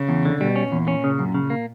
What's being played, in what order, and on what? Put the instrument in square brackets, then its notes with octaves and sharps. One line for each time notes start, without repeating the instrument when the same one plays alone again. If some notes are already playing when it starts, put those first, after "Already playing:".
Already playing: [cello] C#3
[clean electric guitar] E2
D3
[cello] B2 [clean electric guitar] G3
[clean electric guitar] C#4
[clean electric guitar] E2 [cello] A#2
[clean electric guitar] C#4
C#3
F#2
C#3
A#3